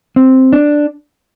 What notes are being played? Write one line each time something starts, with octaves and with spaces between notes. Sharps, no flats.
C4
D4